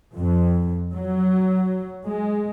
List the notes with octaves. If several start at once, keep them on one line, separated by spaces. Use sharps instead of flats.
F2
F#3
G#3